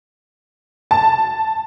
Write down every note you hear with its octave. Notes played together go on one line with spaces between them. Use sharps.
A5